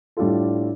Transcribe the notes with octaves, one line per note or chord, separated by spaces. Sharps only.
A2 G3 D4 F4 A4